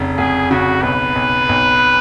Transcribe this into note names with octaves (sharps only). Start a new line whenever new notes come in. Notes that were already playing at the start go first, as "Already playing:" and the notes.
Already playing: F1 C#3
F1 G#4
C#3 F#4
B1 B4
B1
B1